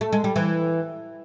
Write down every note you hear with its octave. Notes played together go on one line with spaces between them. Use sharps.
A3
G#3
G3
E3